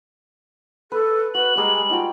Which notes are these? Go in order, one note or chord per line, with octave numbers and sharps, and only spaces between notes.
A4 B4
F#4 B4 F#7
G3 G#3 G#4 A#5
D#4 F4 F#4 G5